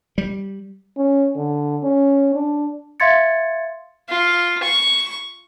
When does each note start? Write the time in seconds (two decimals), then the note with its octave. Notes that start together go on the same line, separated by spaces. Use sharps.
0.18 G3
0.97 C#4
1.36 D3
1.83 C#4
2.35 D4
3.00 E5 F5 C6 G#6 A6 C#7
4.09 F4
4.63 C#6